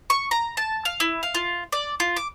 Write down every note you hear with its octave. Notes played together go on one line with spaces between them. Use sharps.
C#6
A#5
A5
F5
E4
F5
F4
D5
F4
D6